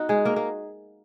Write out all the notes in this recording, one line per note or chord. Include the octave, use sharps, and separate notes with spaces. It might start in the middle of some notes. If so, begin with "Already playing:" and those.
Already playing: B3 D#4 F#4
G#3 G#4
A#3 A#4
A#3 A#4